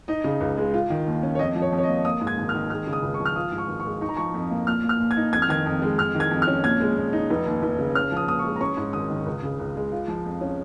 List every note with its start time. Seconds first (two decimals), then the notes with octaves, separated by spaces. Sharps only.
0.08 D#4 D#5
0.24 C#3
0.41 C#2
0.58 G#3
0.74 F4
0.90 D#3
1.06 D#2
1.23 C#4
1.35 C#5
1.39 F2 D#5
1.55 F3
1.62 C#5
1.72 F2
1.78 C#5
1.83 D#5
1.88 A#3
2.04 A#3 D#6
2.21 G#2
2.27 G#6
2.38 G#1
2.49 F6
2.54 D#3
2.70 G#3 F6
2.87 C#3
2.93 D#6
3.03 C#2
3.14 C#6
3.20 F3
3.26 F6
3.36 F4 D#6
3.52 G#2
3.58 C#6
3.68 G#1
3.80 C#6
3.85 G#3
4.01 D#4 C#6
4.09 A#5
4.17 F3 C#6
4.34 F2
4.51 A#3
4.67 A#2 F6
4.84 A#3
4.89 F6
5.00 A#2
5.11 G#6
5.17 D#4
5.33 F2 G#6
5.42 F6
5.49 D#3 G#6
5.66 F2
5.82 G#3
5.98 F2 F6
6.15 D#3
6.20 G#6
6.31 F2
6.42 F6
6.48 C#4
6.64 A#2 G#6
6.80 G#3
6.97 A#2
7.13 D#4
7.30 F1
7.46 D#2
7.63 F1
7.79 C#3
7.95 C#4 F6
8.12 F3 D#6
8.28 A#2 D#6
8.39 C#6
8.44 G#3
8.56 A#5
8.61 C#4 C#6
8.77 G#2
8.93 G#1 D#6
9.10 D#3
9.26 C#2
9.43 C#3
9.59 C#2
9.76 G#3
9.92 F4
10.08 F3
10.25 F2
10.41 C#4